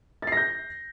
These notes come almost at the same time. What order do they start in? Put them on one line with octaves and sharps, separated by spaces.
A6 C7 A#6 G6